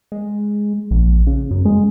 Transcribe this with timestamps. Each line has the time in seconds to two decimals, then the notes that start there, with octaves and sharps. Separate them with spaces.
0.12 G#3
0.91 A#1
1.27 C#3
1.51 F#2
1.65 G#3